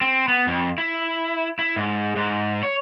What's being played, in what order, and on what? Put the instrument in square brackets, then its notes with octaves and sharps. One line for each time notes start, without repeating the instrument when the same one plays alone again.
[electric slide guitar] C4
B3
F2
E4
E4
G#2
G#2
C#5